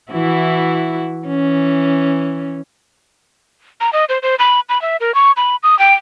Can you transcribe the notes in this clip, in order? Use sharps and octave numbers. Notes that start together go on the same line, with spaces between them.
E3 E4 F#4
E3 C#4
A#5
D#5
C5
C5
B5
B5
E5
A#4
C#6
B5
D#6
G5